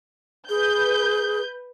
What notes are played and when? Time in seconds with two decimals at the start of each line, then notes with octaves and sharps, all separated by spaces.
0.49 G#4 B4 G6